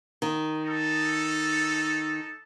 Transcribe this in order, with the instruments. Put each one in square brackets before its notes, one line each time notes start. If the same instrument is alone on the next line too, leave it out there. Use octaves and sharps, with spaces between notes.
[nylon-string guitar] D#3
[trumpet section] D#4 A4